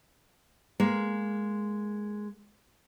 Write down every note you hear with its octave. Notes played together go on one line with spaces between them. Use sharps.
G#3 A#3